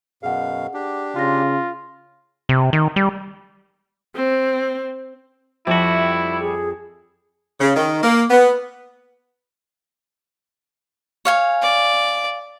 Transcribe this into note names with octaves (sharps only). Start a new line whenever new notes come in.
F#2 B2 G#4 F5 F#5
D4 G4
C#3 F4 C6 A#6
C3
D#3
G3
C4
F2 G3 E4 F#4 E5
G#4
C#3
D#3
A#3
B3
C#5 F5 G#5
D5